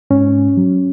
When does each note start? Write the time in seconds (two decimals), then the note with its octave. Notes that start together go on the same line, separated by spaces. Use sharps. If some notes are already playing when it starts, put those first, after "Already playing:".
0.11 G#2 C#4
0.57 F#3